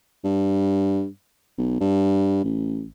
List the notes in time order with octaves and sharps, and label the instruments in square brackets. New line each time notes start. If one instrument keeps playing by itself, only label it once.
[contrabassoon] G2
B1
G2
A1